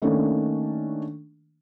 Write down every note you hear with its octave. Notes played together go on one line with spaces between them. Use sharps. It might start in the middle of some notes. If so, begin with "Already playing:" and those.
D#3 A3 A#3 C#4 D4